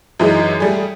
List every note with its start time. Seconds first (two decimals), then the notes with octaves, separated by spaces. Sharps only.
0.19 F#2 E3 G#3 D#4
0.60 G3 A3 G#4